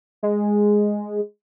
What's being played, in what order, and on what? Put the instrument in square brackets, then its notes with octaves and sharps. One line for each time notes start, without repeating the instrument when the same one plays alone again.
[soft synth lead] G#3